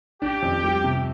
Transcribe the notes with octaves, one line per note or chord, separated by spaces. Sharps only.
D4 G4
F2
G3
C3